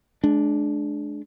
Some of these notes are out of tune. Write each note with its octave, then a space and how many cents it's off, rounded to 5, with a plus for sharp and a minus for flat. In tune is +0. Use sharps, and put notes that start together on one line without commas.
G#3 +35 D4 +0